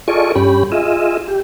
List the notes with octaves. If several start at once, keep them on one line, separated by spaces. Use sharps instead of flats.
F4 G#4 A4 D5 D#5 C#6
G2 C#4 G4 B5
F4 G#4 D#5 E5
G4